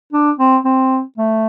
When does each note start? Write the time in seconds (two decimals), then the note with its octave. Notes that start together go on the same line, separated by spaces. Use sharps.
0.13 D4
0.39 C4
0.65 C4
1.17 A3